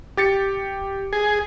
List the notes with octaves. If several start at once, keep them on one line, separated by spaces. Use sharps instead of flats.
G4 A6 C#7
G#4